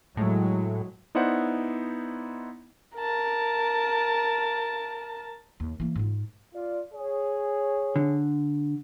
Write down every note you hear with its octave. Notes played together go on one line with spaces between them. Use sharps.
A2 F#3 G#3
B3 D#4 E4 C5 D5 F#5
A#4 A5
D#2
E3 A#3
G#2 F4
F4 D5
G#4 C#5
D3